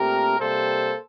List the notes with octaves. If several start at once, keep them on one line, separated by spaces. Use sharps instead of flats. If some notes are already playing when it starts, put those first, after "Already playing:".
Already playing: A#2 A3 C4 G4 A#4
C3 G3 A#3 A4 C5